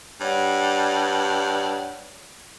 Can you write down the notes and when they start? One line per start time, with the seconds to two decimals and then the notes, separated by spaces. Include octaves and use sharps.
0.20 G2 C#5 D5 F#5